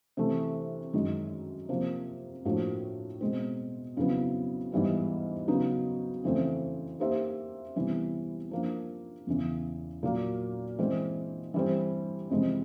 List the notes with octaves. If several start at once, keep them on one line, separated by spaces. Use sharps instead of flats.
C3 E3 A3
F#2 D#3 G#3
C3 F3 A#3
A2 F3 A#3 D4 F#4
B2 G#3 C4
F2 C#3 F#3 B3 E4
G#2 E3 G3 B3
C#3 F#3 B3 D#4
F2 C#3 E3 A3 C4
A#3 D#4 G4 C5 E5
C3 E3 G3 B3 E4
F3 A#3 D4
E2 C#3 E3
A#2 F#3 A#3
E3 G#3 C4
E3 G3 C4
F2 C3 E3 G#3